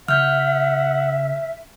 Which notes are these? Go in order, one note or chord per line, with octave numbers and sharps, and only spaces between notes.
C#3 E5 F#5 F6 G6